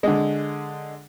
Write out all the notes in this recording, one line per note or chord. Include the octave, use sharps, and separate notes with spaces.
D3 G#3